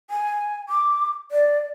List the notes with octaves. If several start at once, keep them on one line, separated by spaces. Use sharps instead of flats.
G#5
D6
D5